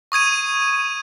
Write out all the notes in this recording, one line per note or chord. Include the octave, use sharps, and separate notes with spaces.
C#6 D#6 G#6 D#7